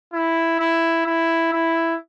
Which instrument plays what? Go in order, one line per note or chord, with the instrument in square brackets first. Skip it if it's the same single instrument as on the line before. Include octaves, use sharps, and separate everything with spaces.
[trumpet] E4
E4
E4
E4